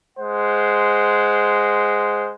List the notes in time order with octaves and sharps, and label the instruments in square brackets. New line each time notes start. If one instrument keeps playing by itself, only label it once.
[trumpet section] G#3 C5 F#5